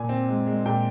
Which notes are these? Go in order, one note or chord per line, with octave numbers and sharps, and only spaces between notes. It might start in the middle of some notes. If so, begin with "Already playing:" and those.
Already playing: A#2 G#5
C4
G#3
G#3
A#2 G5